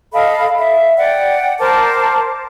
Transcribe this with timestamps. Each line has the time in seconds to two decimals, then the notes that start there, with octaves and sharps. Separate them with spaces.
0.13 A4 D#5 F5 B5
0.58 E5
0.97 D5 F#5 G5
1.58 A#4 C5 A5 D6